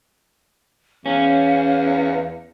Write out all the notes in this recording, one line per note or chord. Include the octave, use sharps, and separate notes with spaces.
E2 C#4 F5